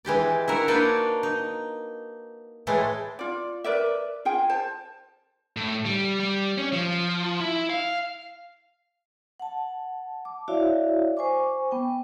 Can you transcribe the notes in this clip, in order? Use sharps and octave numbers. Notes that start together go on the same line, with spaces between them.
E3 G#3 G4 D5
E4 F#4 A#4
A#3 D4 D#4 B4 C#5 D5
D#4
A2 E3 G#3 A3
F4 D5
A#4 B4 D5 E5
F4 G#4 G5
C5 A5
A2
G3
G3
C#4
F3
E4
F5
F#5 A5
D6
E4 F#4 C#5 D5 E5 F5
C5 G#5 C#6 D6
B3 G5